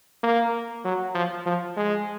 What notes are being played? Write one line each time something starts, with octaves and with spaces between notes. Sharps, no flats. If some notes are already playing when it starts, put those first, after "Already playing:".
A#3
F#3
F3
F3
G#3